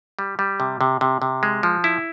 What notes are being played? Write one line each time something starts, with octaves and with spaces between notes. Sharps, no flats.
G3
G3
C3
C3
C3
C3
G#3
F3
E4